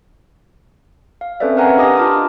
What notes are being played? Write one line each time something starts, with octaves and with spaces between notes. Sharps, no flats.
F5
C4 C#4 A4 B4 D5 E5
A#4 B4 F5 F#5 G#5 A#5
D4 G4 D#5 D6 D#6
F4 A5 A#5 D6 F6